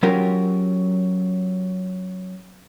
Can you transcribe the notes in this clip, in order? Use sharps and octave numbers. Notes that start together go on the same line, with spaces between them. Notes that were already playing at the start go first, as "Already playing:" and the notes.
F#3 C#4 F4 G4 A#4